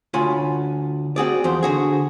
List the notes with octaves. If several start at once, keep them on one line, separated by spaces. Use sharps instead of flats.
D2 F4 C#5 G#5 B5
C4 F#4 G#4 D5
E2 F3 C5
D3 F#4 G#4